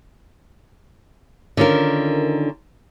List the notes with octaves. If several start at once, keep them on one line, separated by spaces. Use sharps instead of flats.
D3 D#3 C#4 F4 A#4